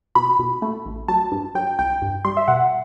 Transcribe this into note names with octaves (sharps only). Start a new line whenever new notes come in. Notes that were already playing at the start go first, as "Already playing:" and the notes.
B2 B5
B2
A3
A1
F#3 A5
G2
F#3 G5
C2 G5
G2
G3 C6
E5
B2 F#5